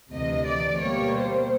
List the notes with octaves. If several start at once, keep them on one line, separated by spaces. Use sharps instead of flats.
D2 C3 E3 D#5
D5
B2 G3 A#3 C#5
C5